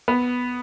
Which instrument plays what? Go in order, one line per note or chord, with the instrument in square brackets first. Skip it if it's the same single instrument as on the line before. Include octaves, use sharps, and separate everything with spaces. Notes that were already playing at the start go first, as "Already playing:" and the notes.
[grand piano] B3